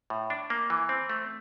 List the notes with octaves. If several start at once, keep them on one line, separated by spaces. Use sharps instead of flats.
A2
D4
A#3
E3
C4
A3